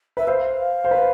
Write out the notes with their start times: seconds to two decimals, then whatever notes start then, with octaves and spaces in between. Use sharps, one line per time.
0.17 B4 E5
0.27 C5 F5
0.84 C5
0.91 B4